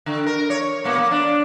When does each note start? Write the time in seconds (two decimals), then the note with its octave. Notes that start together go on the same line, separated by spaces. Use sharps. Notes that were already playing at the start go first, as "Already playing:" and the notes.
0.06 D3
0.26 A#4
0.50 C#5
0.84 B2 A#3 B3
0.98 A#3
1.11 D4